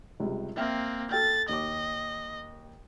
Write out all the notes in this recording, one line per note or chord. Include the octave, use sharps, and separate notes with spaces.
C#2 C3 G3
A#3 C4 E5 G5 F6
A4 G5 F6 A6
D#2 D#5 D6